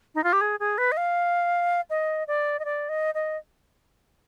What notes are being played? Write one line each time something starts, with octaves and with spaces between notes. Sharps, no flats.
D#4
F4
G4
G#4
G#4
B4
D#5
F5
D#5
D5
D#5
D5
D#5
D#5